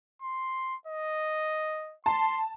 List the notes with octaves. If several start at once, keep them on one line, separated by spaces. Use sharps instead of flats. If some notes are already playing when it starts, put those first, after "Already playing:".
C6
D#5
A5 C6